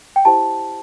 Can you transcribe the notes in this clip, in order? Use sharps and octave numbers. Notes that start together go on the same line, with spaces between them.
G5
E4 G4 C5 A5